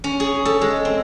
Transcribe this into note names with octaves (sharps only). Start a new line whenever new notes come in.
C#4
G#4
A4
G#3
C4